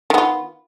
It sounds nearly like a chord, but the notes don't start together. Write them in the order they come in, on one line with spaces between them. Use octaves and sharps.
D#3 B3 F4